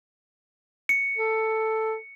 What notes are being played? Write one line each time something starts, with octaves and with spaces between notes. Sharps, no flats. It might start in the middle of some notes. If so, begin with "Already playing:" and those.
C#7
A4